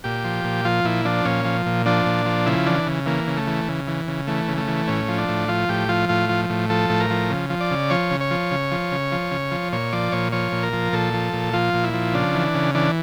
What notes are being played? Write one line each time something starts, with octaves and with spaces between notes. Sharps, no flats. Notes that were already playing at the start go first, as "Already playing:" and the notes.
A#2 G4
F3
A#2
F3 F4
A#2 E4
F3 D4
A#2 C#4
F3
A#2
F3 D4
A#2
F3
C#3 E4
E3 D4
C#3
E3 A#3
C#3
A3
E3
C#3
E3
C#3
E3 A3
C#3
A3
E3
A2 C#4
F3
D4
A2
F3 F4
A2 G4
F3 F4
A2 F4
F3
A2
F3 A4
A2
A#4
F3
C#3
F3
D5
C#3
F3 C#5
C#3
C#5
F3
C#3
F3
C#3
F3
C#3
F3
A#2 C#5
F3 D5
A#2 C#5
F3 C#5
A#2
A#4
F3
A#2 A4
F3
A#2
F3 F4
A#2
E4
F3
C#3 D4
E3
C#3
E3 D4